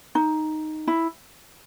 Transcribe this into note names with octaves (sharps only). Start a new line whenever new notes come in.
D#4
E4